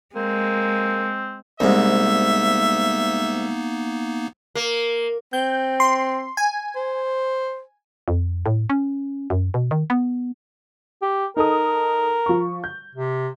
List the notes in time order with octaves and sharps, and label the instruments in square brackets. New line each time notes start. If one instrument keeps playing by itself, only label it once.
[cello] G#3 [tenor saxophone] A#3 [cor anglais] C4
[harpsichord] C2 G#2 [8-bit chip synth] A#3 B3 D#4 [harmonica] E5
[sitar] A#3
[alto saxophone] C4 [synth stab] G6
[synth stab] C6
G#5
[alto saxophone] C5
[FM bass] F2
A2
C#4
F#2
B2
D#3
B3
[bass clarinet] G4
[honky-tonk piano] D#4 A4 D#6 [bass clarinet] A#4
[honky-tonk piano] F3 C#6
G6
[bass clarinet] C3